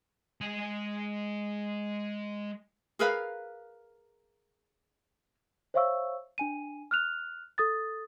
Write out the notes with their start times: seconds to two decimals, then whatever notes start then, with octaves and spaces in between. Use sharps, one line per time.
0.41 G#3 G#5
2.99 G#4 A#4 B4 F5
5.74 C5 C#5 E5 F5 C#6 E6
6.38 D4 G#5 D#7
6.91 F6 F#6 F7
7.58 A4 D#6 A6